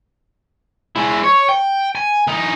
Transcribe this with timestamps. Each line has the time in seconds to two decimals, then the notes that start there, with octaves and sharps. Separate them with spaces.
0.96 G#3 E4
1.24 C#5
1.49 G5
1.95 G#5
2.28 E3 D#4